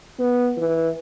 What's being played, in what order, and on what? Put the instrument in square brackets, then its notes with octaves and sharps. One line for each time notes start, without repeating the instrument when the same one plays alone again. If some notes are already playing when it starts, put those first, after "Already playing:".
[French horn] B3
E3